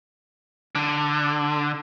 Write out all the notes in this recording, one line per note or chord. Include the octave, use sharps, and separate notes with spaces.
D3